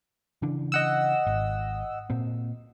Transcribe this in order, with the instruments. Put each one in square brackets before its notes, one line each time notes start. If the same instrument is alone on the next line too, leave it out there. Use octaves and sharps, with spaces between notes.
[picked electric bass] C#3 E3 D4
[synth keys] D#5 F#5 E6
[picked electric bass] G#1
A#2 C4